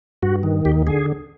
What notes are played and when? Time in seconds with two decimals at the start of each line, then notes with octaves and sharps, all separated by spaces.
0.23 G2 F#4
0.43 D#3
0.65 D#2 G4
0.87 D3 G#4